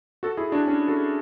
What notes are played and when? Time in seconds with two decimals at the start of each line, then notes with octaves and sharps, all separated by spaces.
0.23 F#4 A4
0.37 E4 G#4
0.52 D4 F#4
0.67 C#4
0.88 F#4 A4